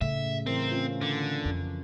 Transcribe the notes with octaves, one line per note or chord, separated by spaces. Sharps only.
A2 C#3 E5
E3 C4 A#4
C#4 F4
D3
F2